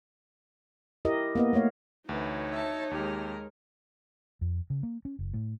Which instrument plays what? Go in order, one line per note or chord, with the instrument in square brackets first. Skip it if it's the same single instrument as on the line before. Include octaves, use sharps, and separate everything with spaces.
[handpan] E4 G4 A#4 D#5
A#3 B3 D#5
A3 A#3 C#5 F5
[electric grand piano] D2 [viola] E3 B4 [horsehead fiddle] D#4 C#5
[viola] E5 A5
[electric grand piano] D#2 G4 [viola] G#3 A#4
[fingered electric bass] F2
C#3
A#3
C#4
F#1
A2